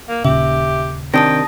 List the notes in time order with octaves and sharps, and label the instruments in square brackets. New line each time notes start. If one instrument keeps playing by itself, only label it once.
[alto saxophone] A#3
[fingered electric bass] D#1 A#2 C#3 [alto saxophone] G4 [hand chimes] E5
[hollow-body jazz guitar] C3 D#3 D4 [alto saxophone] G5 [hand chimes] A5 D#6 A#6